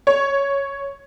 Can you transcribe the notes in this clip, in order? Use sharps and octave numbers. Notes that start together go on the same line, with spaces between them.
C#5